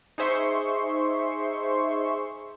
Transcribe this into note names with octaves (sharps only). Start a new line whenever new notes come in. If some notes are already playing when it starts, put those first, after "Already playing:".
D#4 G#4 C5 E5 C6 C#6